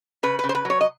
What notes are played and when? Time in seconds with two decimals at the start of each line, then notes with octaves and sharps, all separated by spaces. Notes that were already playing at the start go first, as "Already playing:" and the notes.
0.23 C#3 B4
0.39 C#3 B4
0.49 C5
0.55 B4
0.65 F#3 C#5
0.81 D#5